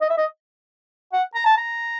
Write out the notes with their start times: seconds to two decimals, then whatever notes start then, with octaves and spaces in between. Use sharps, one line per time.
0.01 D#5
0.10 E5
0.18 D#5
1.13 F#5
1.35 A#5
1.45 A5
1.57 A#5